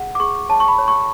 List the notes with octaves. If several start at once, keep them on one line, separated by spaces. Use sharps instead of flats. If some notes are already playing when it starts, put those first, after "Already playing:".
Already playing: G#4 F#5
D6
G#4 C#6
C#5 A5
C#6
B5
C#5
C#6